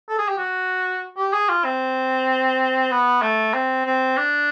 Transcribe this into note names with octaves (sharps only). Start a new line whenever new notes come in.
A4
G#4
G4
F#4
G4
G#4
F4
C4
B3
A3
C4
C4
D4